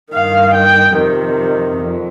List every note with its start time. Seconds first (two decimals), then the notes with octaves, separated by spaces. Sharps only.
0.12 G2 D#3 F5
0.54 G5
0.95 F2 C3 D#3
1.79 F2